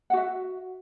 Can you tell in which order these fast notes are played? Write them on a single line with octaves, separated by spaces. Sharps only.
F#5 F#4 E5